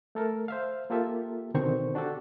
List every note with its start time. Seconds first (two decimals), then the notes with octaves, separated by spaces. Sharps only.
0.15 A3 A4 A#4
0.48 C5 E5 F5
0.90 A#3 F4 G4 A4 E5
1.54 B2 D3 D#3 C4 C5 C#6
1.95 D4 F#4 G4 A4